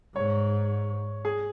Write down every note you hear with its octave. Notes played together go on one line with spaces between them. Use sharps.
G#2 C#5
G#4